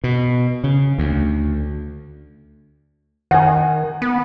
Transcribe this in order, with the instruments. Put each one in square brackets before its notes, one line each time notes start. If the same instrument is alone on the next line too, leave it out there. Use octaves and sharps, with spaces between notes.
[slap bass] B2
C#3
D2
[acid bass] D#3 [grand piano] F#5 G#5
[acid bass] B3